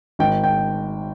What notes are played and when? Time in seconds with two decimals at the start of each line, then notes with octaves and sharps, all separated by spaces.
0.19 G#1 G5
0.44 G5